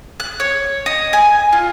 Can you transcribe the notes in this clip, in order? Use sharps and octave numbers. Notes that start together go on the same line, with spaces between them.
F#6
C#5
D#5
G#5
F4